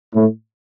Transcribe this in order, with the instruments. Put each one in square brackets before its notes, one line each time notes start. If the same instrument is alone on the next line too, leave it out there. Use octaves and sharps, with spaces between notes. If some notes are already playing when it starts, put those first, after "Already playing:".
[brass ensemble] A2